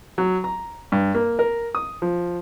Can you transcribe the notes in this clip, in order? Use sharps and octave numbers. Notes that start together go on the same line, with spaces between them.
F#3
A#5
G2
A#3
A#4
D#6
F3